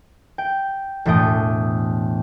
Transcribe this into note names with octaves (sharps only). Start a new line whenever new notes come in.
G5
E1 A2 A3 G5 D#6